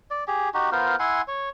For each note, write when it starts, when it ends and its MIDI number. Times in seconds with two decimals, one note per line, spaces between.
0.11 0.24 74
0.28 0.49 67
0.28 0.49 68
0.54 0.70 63
0.54 0.70 66
0.54 0.70 67
0.72 0.96 59
0.72 0.96 65
0.72 0.96 70
0.72 0.96 72
0.99 1.21 64
0.99 1.21 78
0.99 1.21 80
0.99 1.21 84
1.28 1.49 73